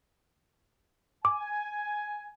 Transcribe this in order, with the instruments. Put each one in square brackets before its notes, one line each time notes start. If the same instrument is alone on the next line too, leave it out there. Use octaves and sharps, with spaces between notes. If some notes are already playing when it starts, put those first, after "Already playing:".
[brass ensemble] G#5 [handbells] D6